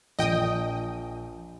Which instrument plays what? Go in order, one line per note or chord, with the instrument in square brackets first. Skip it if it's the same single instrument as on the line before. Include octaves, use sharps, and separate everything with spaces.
[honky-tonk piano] A#1 [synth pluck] D#5 G5 D#6